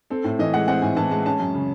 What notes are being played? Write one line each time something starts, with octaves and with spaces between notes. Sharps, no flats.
C4 A4
A2
E3 D#5
G#3 F#5
C4 F#5
A2 G#5
E3 A5
G#3 A5
C#4 A5
F#2
C#3